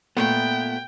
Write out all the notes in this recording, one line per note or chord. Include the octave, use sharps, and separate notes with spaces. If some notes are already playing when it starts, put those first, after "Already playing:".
A#2 A3 B3 G5